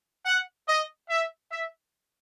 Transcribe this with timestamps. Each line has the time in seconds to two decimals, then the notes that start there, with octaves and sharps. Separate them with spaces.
0.25 F#5
0.67 D#5
1.09 E5
1.50 E5